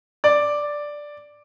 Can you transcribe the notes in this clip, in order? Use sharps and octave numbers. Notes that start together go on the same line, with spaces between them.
D5